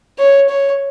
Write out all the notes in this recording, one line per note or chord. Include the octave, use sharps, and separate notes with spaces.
C#5
C#5